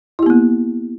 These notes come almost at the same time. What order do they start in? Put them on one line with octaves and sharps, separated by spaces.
E4 G4 B3 A#3